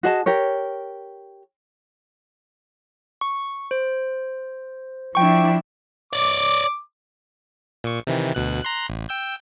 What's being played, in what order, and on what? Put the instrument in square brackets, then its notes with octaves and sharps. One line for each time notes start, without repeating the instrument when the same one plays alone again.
[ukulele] F#4 G#4 D#5 A5
G4 A#4 C#5
[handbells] C#6
C5
[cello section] F3 D4 E4 [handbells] G5 C#6
[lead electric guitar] C#5 D5 [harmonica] D6
[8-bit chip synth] A#2 C#6
C3 D#3 E3
D2 B2 F#6
A#5 C6 F#6
A1
G5 E6 G6